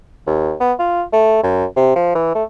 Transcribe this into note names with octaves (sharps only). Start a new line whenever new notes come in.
D#2
B3
F4
A3
F#2
C3
F3
E3
A3